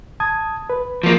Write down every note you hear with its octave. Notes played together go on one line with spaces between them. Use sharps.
A5 D#6 G#6
B4
F3 A#3